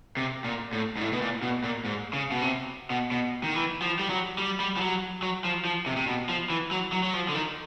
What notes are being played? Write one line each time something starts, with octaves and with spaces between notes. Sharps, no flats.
C3
A#2
A2
G#2
A2
B2
A#2
B2
A#2
G#2
C#3
B2
C3
B2
B2
D#3
E3
F3
G3
F#3
G3
G3
F3
F#3
F#3
F3
F3
C3
C3
B2
F3
E3
F#3
F#3
F#3
F3
D3
D#3